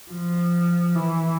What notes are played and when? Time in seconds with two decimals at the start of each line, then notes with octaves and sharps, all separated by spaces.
0.12 F3
0.96 E3